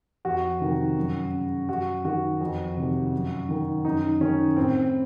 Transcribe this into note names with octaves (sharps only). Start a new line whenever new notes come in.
F2 F#4
C3 D#3
F#2
C#3
F#2 F#4
D#3 F#4
F2
C3 D#3
F#2
D#3
F#2 D#4
D#3 C#4
A2 C4